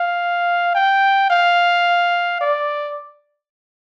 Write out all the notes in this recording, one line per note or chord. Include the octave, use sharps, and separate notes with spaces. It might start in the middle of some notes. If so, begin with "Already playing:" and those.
Already playing: F5
G5
F5
D5